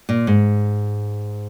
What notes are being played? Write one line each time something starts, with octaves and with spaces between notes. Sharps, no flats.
A#2
G#2